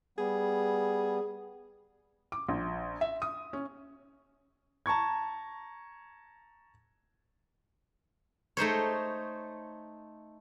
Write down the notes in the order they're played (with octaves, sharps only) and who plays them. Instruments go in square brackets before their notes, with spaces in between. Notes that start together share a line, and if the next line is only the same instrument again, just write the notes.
[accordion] G3 B3 [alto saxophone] G#4
[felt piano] D6
A#1
E5
D#6
C#4
[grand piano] A5 A#5 C#6 G#6
[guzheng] A3 D#4 C5 C#5